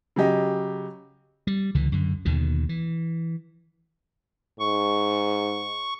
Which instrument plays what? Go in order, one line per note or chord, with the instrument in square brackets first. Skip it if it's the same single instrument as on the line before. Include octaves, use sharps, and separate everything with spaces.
[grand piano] C#3 F#3 G4 D#5
[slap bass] G3
C#2 D3 E3
F#2 D3
D#2 B2 D3 D#3
E3
[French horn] G#2 [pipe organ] C#6